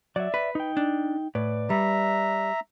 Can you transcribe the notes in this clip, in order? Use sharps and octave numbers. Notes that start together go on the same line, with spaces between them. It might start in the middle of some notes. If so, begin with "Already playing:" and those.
F#3 D5 E5
B4
D#4 G5
D4
A2 B4 D5
G3 E5 A#5